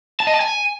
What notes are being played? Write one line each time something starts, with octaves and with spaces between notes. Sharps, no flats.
A5
D#5
A5
G#5